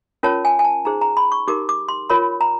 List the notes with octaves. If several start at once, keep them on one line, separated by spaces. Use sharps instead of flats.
C#4 F4 A#4 C#5 A5
G#5
G#5
A5
D#4 G#4 C5 A#5
A#5
B5
C#6
D#4 G4 A#4 D6
D6
C6
F4 A#4 C#5 B5
A#5